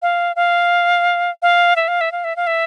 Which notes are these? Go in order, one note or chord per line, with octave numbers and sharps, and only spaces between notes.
F5
F5
F5
E5
F5
E5
F5
E5
F5
E5